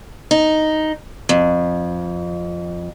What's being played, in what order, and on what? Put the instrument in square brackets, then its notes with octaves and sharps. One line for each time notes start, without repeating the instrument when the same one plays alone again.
[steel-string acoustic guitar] D#4
F2